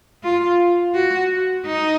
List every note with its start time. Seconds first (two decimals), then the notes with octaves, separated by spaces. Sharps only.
0.24 F4
0.94 F#4
1.66 D#4